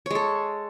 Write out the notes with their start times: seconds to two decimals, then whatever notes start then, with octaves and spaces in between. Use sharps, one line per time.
0.06 C#5
0.11 G#3
0.15 A4